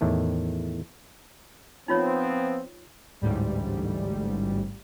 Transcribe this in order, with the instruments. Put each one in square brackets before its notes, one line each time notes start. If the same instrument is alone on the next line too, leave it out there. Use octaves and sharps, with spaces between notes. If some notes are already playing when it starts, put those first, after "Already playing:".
[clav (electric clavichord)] E2 A2 D#3 A3
[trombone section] F3 B3 C4 [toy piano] D#4 F4 C#5
[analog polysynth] A1 D2 G#2 G3